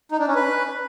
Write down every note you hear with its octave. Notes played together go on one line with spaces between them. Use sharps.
D#4
D4
C#4
B4